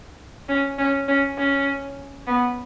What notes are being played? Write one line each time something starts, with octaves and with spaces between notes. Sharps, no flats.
C#4
C#4
C#4
C#4
B3